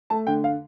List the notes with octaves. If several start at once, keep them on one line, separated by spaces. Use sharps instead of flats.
A3 A5
D3 G5
F5